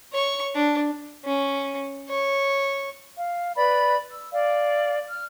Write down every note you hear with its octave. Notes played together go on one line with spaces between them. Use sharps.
C#5 C#6
D4
C#4
C#5
F5
B4 D5 B5
E6
D5 F5
F6